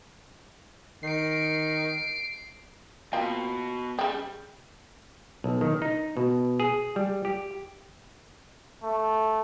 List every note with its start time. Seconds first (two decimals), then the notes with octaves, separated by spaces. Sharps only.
1.03 D#3 C7 D7
3.13 B2 F3 A#3 C4
3.99 C#3 G3 G4
5.44 B1
5.61 D#3
5.82 D#4
6.17 B2
6.60 G#4
6.96 G3
7.25 G4
8.84 A3